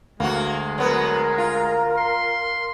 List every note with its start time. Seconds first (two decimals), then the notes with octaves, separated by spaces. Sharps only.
0.20 D2 G#3 A#3 F#4
0.78 F#3 B3 A#4
1.38 F4
1.97 C6